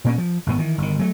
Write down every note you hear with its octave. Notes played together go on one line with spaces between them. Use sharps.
A#2 A#3 C#4
F3
G#1 G#2 B3
D#3 E3
G1 D#3
F#3 A3